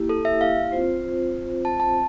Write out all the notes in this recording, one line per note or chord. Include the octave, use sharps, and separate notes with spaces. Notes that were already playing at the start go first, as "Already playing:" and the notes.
Already playing: A#3 E4 G4
A4
E5
F5
C4 F4 C5
A5
A5